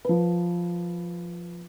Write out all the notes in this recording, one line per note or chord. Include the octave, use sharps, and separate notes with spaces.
F3 B4